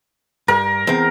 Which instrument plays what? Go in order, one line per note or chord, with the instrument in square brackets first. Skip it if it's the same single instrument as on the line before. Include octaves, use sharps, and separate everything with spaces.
[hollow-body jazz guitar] G2 [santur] A#4
[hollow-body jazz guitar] E2 C4